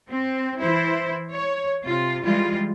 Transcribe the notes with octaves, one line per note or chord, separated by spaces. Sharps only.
C4
E3 E4 C5
C#5
C3 F4
E3 G3 G#3 F4